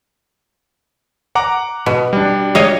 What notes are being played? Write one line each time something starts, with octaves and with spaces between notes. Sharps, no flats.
F#5 A#5 D6
B2
G3 D4
C#5 D#5 F5